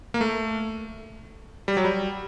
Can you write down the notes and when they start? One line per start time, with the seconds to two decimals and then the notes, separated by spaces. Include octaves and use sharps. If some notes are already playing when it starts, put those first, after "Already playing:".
0.14 A#3
0.21 A3
1.68 G3
1.77 F#3
1.85 G3